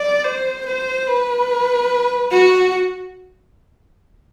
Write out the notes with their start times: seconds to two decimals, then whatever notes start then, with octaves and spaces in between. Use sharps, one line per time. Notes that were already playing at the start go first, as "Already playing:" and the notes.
Already playing: D5
0.25 C5
0.66 C5
1.07 B4
2.31 F#4